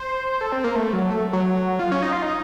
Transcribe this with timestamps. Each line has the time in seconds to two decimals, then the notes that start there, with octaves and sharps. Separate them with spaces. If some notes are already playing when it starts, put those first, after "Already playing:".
Already playing: C5
0.41 A4
0.52 C4
0.64 A#3
0.75 A3
0.93 F#3
1.10 A3
1.33 F#3
1.79 F4
1.92 C#4
2.03 D#4
2.13 F4
2.22 D#4